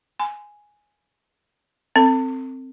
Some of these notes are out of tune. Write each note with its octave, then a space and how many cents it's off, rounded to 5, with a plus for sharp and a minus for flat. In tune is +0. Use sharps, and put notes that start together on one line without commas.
G#5 +0 C6 -30
C4 +0 A4 +40